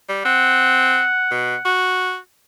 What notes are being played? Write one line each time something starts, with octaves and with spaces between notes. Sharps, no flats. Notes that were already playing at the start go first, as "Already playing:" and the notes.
G3
C4 F#5
B2
F#4